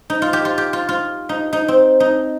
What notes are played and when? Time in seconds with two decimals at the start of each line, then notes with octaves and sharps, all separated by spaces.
0.10 D#4
0.22 F4
0.33 G4
0.45 F4
0.58 G4
0.73 F4
0.89 F4
1.29 D#4
1.53 D#4
1.68 C4
2.00 D#4